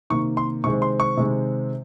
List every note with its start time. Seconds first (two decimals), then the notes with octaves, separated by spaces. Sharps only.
0.10 C3 D#3 A#3 C#6
0.37 C6
0.64 C3 D#3 G#3 C4 C#6
0.82 C6
1.00 C#6
1.17 C3 D#3 G#3 C4